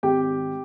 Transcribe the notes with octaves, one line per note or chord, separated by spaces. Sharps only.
G#1 G4 G5